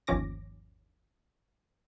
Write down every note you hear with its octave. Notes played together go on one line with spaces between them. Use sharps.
G1 D#2 F3 C#4 D6 A#6